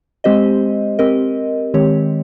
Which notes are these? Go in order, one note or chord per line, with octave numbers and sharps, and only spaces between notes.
G#3 C4 G4 C5 D#5
C4 G4 A#4 D#5
D#3 G#3 C4 G4 C#5